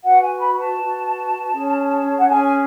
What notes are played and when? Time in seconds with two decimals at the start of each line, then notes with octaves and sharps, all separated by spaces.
0.03 F#4 B4 F#5
0.21 G#5
0.40 B5
0.55 B5
0.58 A5
0.77 F#4 B4
1.53 C#4 G#4 C#5
2.17 F#5
2.27 C#4 G#4 C#5 G#5
2.42 G#5